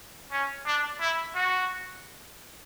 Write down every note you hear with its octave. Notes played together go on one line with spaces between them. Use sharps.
C#4
D4
E4
F#4